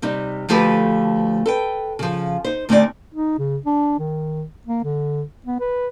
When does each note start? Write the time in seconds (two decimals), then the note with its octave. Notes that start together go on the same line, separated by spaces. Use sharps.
0.02 C3 G3 D#4
0.48 D2 F3 A3 G4 A4 B4
1.46 A4 B4 G5
1.99 C#3 F3
2.44 D#4 C5
2.69 D2 A3 C4 D#4 D5
3.15 D#4
3.39 C#3
3.66 D4
3.99 D#3
4.67 A#3
4.84 D3
5.46 B3
5.60 B4